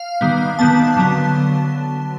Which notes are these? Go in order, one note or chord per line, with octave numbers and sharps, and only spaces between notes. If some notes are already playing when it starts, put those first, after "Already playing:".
Already playing: F5
D#3 G3 B3
D#3 G3 B3 A5
D3 F#3 B3